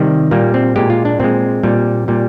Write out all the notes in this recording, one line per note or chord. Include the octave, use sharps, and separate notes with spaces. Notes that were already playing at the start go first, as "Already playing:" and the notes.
Already playing: C3 D#3 G3
A#2 G3 A#3
C4
A#2 G#3 G4
F4
D4
A#2 G#3 C4
A#2 G3
A#2 G3